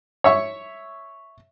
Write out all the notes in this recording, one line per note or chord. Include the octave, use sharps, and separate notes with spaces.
C#5 E5 C#6